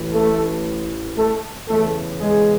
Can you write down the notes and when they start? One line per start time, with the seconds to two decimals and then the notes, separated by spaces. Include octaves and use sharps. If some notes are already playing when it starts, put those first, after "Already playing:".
Already playing: A1 A2 E3
0.13 A3 A4
1.16 A3 A4
1.68 E2 C#3 E3 A3 A4
2.20 G#3 G#4